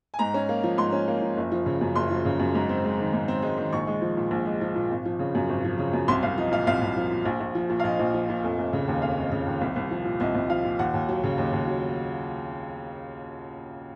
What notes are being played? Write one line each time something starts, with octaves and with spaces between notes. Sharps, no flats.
G#5
G#2 A#5
C#4
A#3
F3
G#2 C6
C#4
A#3
F3
F#1
F3
C#3
F#2
F#1 C6
F3
C#3
F#2
G#2
C4
G#3
D#3
G#2
C4
G#3
D#3
A#1 C#6
G#3
F3
A#2
A#1
G#3
F3
A#2
G#1
F3
C#3
F#2
G#1
F3
C#3
F#2
C2 C6
C2 F5
F3 D#5
A#2 F5
C2 F5
C2
F3
A#2
A#1
A#1
F3
A#2
F5
A#1 D#5
A#1
F3
A#2
F1
F1
C#3
D#2
F1 F5
F1
C#3
D#2
C2
C2
F3
A#2
C2 D#5
C2
F3 F5
A#2
D#2 F#5
D#2
F#3
C#3
D#2
D#2
F#3